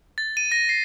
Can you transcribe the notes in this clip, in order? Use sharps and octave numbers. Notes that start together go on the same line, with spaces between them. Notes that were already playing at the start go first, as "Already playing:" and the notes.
A6
D#7
A#6
C7